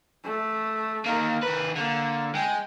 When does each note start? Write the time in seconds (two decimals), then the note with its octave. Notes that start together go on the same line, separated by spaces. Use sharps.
0.24 A3
1.06 D#3 A#3 A#4
1.43 D#3 B4
1.76 D3 A#3
2.35 G#3 G5